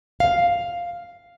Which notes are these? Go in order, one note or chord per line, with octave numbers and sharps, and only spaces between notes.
F5